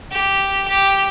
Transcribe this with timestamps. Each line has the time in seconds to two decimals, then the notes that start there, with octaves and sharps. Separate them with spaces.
0.11 G4
0.68 G4